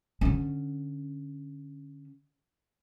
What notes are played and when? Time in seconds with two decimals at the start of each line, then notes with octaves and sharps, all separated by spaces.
0.21 D3 C#4